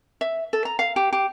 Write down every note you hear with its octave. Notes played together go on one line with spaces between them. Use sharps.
E5
A4
A#5
F5
G4
G4